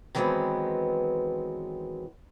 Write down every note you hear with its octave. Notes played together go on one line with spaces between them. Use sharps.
D#3 E3 F#3 G#3 B3 C4